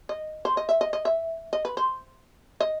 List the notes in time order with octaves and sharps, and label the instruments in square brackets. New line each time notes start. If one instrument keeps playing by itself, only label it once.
[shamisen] D#5
C5
D#5
E5
D#5
D#5
E5
D#5
B4
C5
D#5